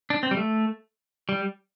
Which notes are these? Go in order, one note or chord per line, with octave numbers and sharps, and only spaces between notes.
D4
C4
G3
A3
G3